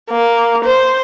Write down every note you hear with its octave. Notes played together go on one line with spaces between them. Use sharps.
A#3
C5